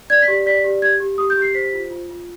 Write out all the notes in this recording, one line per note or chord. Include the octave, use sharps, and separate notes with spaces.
D5 G#6
B6
G4
D5 B6
G4
G4 G#6
G4
G4 D#6
G6
G4 C7
C5 B6
F4
F4
F4